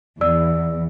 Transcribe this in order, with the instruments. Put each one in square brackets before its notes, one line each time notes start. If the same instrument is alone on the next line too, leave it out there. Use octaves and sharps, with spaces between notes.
[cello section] E2 [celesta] D5 E6